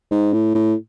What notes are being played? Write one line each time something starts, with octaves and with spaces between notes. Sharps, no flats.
G#2
A2
A2